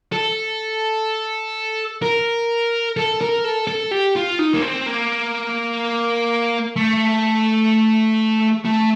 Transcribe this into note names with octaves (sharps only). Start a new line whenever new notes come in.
A4
A#4
A4
A#4
A4
A4
G4
F4
D#4
A#3
C4
A#3
A3
A3